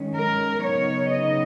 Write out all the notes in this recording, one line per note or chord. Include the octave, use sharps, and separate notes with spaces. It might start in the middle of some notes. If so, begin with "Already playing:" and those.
Already playing: D#3 G#3 C#4
A#4
C#3 F#3 B3 D#4 C#5
D#5